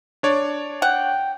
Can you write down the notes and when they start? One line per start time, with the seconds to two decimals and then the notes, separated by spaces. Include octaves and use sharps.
0.23 D4 C#5 D5
0.82 F#5 G5